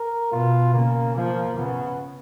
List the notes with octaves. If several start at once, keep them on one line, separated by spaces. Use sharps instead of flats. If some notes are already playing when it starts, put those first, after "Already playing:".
Already playing: A#4
B2 F4
C#3 A#3
F3 A#3
C#3 B3